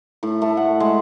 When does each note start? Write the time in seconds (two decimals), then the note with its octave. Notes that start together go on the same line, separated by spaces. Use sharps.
0.23 A2
0.42 A3
0.57 F#5
0.80 G#3